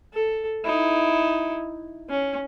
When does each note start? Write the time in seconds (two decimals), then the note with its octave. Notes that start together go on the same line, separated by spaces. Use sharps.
0.14 A4
0.65 D#4 E4
2.09 C#4